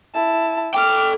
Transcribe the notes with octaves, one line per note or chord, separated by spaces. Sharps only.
E4 A5
A4 G5 D6 F6